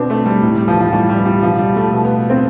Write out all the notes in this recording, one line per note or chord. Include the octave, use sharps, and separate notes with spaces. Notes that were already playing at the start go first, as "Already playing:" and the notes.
Already playing: B2 B3 C4 D4
A3
G3
A2
G3
E3 F3
F3
A2 G3
G3
E3
G3
B2 F3
G3
A3
B2
B3
C4